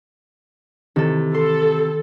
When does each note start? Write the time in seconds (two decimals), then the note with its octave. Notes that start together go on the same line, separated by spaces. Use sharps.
0.96 C3 D#3 E3 A4
1.34 A4 C6